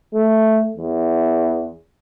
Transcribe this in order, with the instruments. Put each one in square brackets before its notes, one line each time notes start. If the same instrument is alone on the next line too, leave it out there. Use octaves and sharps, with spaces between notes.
[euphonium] A3
E2